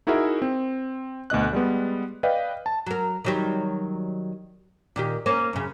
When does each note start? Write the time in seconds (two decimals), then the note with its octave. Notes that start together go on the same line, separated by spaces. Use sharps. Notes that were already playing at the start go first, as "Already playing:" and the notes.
0.07 D#4 E4 F#4 G#4 A#4 E5
0.42 C4
1.30 D2 B2 D#5 F#6
1.53 G3 G#3 B3
2.23 B4 D5 D#5 F5 G5
2.66 A5
2.86 F#3 A#4
3.25 D#3 F#3 G3
4.96 A#2 D#3 G4
5.26 A#3 C#4 C5
5.53 F#2 C#3